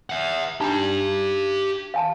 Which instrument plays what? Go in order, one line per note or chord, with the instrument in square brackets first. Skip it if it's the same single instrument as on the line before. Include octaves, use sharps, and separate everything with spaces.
[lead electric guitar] E5 F#5
[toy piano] D4 D#4 A#5 [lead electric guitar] G4 A5
[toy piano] F5 G#5 A5